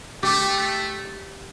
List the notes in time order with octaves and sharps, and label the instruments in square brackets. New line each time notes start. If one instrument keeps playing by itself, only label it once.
[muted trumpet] A3 [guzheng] G4
[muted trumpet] A3